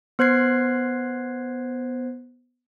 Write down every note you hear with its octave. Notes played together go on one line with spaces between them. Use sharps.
B3 C5 F#6 G#6 C7